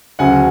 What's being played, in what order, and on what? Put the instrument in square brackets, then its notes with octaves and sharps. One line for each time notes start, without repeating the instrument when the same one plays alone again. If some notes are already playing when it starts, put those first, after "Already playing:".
[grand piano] D2 C#3 F#3 F#5 G#5